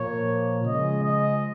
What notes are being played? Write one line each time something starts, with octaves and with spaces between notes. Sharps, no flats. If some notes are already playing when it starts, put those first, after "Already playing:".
Already playing: A#2 F3 A#3 C#5
C#3 F3 G#3 D#5
D#5